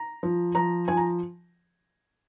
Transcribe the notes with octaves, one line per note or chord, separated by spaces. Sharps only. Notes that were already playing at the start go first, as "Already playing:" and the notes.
Already playing: A#5
F3
F3 A#5
F3 G#5
A#5